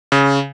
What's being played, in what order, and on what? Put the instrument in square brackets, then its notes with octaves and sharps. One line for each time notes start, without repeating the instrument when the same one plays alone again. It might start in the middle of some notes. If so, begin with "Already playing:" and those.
[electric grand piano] C#3